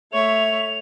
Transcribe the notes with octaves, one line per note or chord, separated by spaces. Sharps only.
A3 C#5 E5 F7